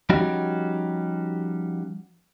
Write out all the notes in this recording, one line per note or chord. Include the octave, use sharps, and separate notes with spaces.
F3 G3 C#4 D#4 F#4 G4